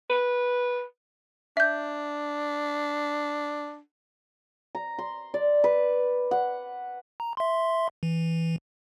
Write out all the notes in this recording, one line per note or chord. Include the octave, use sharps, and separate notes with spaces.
B4
D4 E5 G6
A#5
C6
D5
B4
F#5
A#5
E5 C6
E3